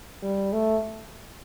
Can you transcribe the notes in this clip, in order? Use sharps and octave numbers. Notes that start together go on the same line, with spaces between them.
G3
A3